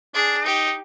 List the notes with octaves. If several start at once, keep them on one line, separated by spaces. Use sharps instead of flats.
D4 G#4
D#4 G4